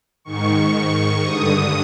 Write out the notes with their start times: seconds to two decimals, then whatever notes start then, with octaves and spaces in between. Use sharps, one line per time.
0.25 G#2 D#3 C#6
1.23 G2 D3 D#6